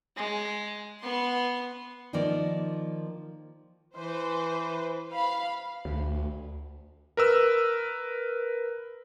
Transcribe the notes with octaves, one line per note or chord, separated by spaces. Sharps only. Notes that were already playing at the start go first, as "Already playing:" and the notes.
G#3
B3 C6
D#3 F3 A#3 A#4 D5
E3 B4 C5
F5 B5
D2
A#4 B4 E6